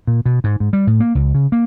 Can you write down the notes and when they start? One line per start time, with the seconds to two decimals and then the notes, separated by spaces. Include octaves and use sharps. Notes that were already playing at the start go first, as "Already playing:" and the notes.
0.07 A#2
0.26 B2
0.44 G#2
0.60 G#2
0.73 G3
0.87 A2
1.00 A#3
1.15 C#2
1.35 C#3
1.52 A#3